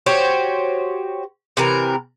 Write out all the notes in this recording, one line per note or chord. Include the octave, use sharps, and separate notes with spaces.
F#4 G4 C5 C#5
C3 E3 A#4